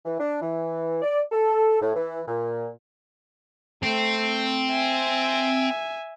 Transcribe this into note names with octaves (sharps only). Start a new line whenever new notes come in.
E3
D4
E3
D5
A4
A2
E3
A#2
A3 C4
E5 G#5